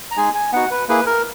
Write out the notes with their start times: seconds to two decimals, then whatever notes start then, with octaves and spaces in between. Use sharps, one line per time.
0.11 A#5
0.17 G#3 D#4 G#4 G#5
0.35 G#5
0.52 B3 D#4 F#4 F#5
0.71 B4
0.88 A#3 E4 G#4 B4
1.06 A#4